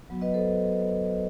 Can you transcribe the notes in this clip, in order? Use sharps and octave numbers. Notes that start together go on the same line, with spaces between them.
F#3 B3 F#4
B4 D#5
A4 C5